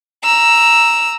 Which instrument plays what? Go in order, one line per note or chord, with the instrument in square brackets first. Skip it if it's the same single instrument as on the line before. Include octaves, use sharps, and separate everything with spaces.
[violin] A#5 E6